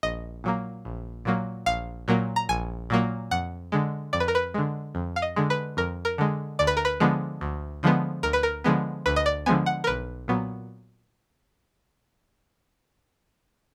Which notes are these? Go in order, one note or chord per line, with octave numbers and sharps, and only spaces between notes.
A#1 D#5
A#2 F#3 A#3
A#1
A#2 F#3 A#3
A#1 F5
A#2 F#3 A#3
A#5
A#1 G#5
A#2 F#3 A#3
F2 F#5
D3 G#3
F2 D5
B4
A#4
B4
D3 G#3
F2
F5
D#5
D3 G#3
B4
F2 A#4
A#4
D3 G#3
D2 D5
B4
A#4
B4
D3 F3 G#3 B3
D2
D3 F3 G#3 B3
D2 A#4
B4
A#4
D3 F3 G#3 B3
D2 B4
D#5
D5
D3 F3 G#3 B3 G#5
F#5
A#4
B1 B4
A#2 F#3 B3